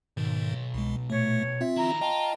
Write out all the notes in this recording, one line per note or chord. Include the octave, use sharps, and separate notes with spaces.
B1 G#2 D#3
C2 G#3
A#2 A3 C#5
C4 F4 E5
D#3 E4 A#5
F4 D#5 G5 A5